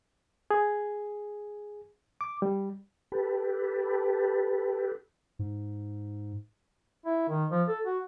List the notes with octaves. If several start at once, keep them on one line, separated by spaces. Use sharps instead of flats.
G#4
D6
G3
G4 A4 B4
G#2
E4
D#3
F3
A4
F#4